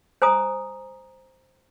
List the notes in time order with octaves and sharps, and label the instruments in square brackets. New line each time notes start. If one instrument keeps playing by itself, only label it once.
[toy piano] C5 G#5 A#5 D#6